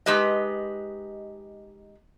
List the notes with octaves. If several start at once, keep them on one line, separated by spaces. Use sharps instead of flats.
G#3 D#4 G4 B4 D#5